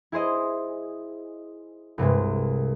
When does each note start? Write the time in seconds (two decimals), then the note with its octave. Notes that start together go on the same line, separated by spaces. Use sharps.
0.12 E4 G#4 C5 D#5
1.98 C2 G2 C3 G#3